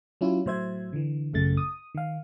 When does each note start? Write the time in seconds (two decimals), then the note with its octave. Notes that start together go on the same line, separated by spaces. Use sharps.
0.21 F#3 C#4 E4 F4
0.46 A2 F#3 C5 E5 G#6
0.93 D3 E3
1.34 A1 F#2 C#3 A3 A6
1.57 D#6
1.95 D#3 F5